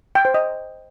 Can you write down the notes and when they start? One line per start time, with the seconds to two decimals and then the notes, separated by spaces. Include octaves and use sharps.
0.15 G5
0.25 C5
0.34 D#5